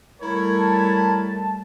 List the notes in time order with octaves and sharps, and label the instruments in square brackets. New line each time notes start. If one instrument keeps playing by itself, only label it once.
[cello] G3 A3 [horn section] E4 A#4 C#5
[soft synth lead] A5